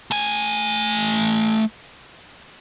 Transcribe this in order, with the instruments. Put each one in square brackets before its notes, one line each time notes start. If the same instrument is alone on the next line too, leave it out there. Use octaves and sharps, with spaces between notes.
[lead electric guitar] A3 G#5